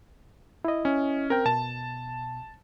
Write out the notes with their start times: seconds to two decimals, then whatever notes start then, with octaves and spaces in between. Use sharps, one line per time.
0.65 E4 D#5
0.85 C#4
1.30 C4 A#4 G5
1.46 B2 A5